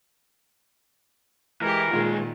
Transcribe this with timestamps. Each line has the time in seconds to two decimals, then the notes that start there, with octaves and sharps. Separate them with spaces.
1.61 E3 G#3 G4 A#4
1.91 D2 A#2 D#3 G#3 F4